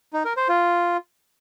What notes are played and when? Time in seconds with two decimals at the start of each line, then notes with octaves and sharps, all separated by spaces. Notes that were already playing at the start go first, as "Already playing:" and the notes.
0.13 D#4
0.25 A#4
0.37 C5
0.49 F4